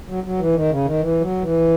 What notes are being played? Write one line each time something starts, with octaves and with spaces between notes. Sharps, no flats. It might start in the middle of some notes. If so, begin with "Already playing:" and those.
F#3
F#3
E3
D#3
C#3
D#3
E3
F#3
E3